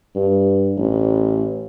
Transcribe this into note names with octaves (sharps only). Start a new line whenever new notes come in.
G2
A1